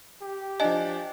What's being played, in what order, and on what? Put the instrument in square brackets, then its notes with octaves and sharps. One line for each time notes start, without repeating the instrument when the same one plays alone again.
[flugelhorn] G4
[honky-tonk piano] F3 D4 [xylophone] D#5 G#5